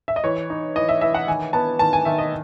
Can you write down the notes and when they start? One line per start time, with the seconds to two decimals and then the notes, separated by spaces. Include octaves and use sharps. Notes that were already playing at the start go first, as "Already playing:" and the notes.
0.08 E5
0.16 D#5
0.24 E3 C#5
0.50 D#4
0.76 E3 D#5
0.89 E5
1.01 E3 E5
1.14 F#5
1.27 D#3 G#5
1.53 B3 A5
1.79 D#3 A5
1.93 G#5
2.05 D#3 E5
2.18 D#5